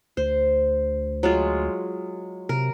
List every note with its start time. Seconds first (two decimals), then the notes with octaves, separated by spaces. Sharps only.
0.17 D2 C5
1.23 F#3 G#3 F4
2.49 C3 A#4